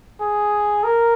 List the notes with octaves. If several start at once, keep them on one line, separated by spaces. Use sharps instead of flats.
G#4
A#4